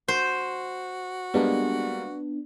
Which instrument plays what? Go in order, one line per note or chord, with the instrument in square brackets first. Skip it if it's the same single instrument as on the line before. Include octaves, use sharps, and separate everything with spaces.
[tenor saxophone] F#4 [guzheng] C5
[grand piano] G3 G#3 A#3 [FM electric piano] B3 D4